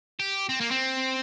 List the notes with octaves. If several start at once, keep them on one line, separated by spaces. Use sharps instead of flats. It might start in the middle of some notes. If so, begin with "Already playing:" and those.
G4
C4
A#3
C4